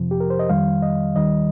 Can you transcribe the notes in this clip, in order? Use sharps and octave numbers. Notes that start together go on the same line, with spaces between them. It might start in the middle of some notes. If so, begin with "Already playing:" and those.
Already playing: F2 C3 F3
G4
A#4
C5
D#5
F2 D#3 G3 F5
D#5
D#2 D#3 G3 D#5